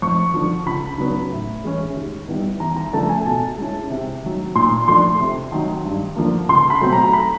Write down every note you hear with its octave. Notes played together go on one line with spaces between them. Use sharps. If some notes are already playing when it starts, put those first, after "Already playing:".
F2 C#6
D3 F3
C#2 B5
C#3 F#3 B3 D4
A2
E3 G#3 C#4
D#2
D#3 G3 B3 E4
E2 A#5
A#5
C#3 F3 A3 D4 A5
G#5
B2 A5
G#3 C#4 E4
C3
D#3 F#3
A#2 C6
F3 A3 D4 C6
C3
D#3 F#3
G2
D3 F3 A#3
C#2 C6
B5
B2 F#3 A3 C4
A#5
B5